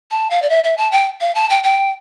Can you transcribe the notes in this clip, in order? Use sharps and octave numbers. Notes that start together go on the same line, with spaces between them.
A5
F5
D5
E5
E5
A5
G5
F5
A5
G5
G5